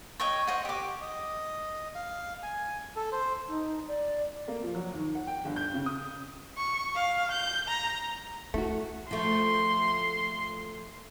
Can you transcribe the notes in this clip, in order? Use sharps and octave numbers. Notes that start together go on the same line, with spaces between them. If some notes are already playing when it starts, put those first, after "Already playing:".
C#5 D#5 G5 C#6
C5 D#5 F#5
G4 D6
D#5
F5
G#5
A4
C5
D#4
D5
A#3
F3
F#3
D#2
F#5
G5
G1
G6
C#3
D#6
C#6
F5
G6
A#5
A3 E4 F#4
F3 A3 C6